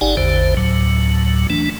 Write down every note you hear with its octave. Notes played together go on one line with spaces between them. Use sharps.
G1 D#4 G4 D5 F#5 G#5
A1 E2 D3 C5
D2 A2 F#3
E3 A3 D4